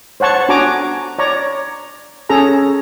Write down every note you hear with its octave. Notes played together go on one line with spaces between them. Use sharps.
C5 C#5 F#5 A5 C#6
D4 F#4 G#5 A#5 D6
C#5 D5 A#5
C#4 G#4 A4 A#5